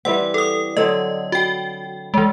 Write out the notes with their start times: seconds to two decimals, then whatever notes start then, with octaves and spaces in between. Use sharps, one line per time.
0.05 E3 G3 C4 F#5
0.34 A4 D#6
0.77 D3 F#3 C4 D#5
1.32 F#4 G5
2.14 E3 G#3 D5